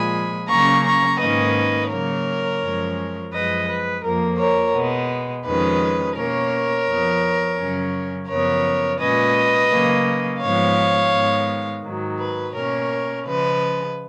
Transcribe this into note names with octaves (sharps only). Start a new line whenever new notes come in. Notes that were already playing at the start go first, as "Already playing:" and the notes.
Already playing: A#2 F3 G#3 G#5 B5
C#3 F#3 A#3 C#4 A#5 C#6
A#5 C#6
G#2 D#3 A#3 C#4 B4 D#5
C#3 F#3 A#3 A#4 C#5
F#2 F3 G#3 C#4
F#2 F3 G#3 B4 D#5
B4
F2 F3 A#3 A#4
A#4 C#5
B2 G#3 B3
F2 D#3 G#3 C#4 B4
B2 A#3 C#4 A#4 C#5
F2 F3 B3
F#2 C#3 F#3 C#4
F#2 C#3 F3 B3 A#4 C#5
A#2 G#3 C#4 B4 D#5
C#3 F#3 A#3 C#4
G#2 F3 G#3 B3 C#5 F5
G#2 D#3 G#3 B3
G#2 D#3 F#3
B4
B2 A#3 C#4 A#4 C#5
C#3 F3 G#3 B4